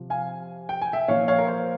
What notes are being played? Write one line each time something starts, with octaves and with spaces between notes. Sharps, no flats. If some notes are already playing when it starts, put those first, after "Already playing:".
Already playing: C3 F3
F5 G#5
G5
G#5
E5 G5
A#2 F3 C#5 F5
C#5 F5
A#4
C5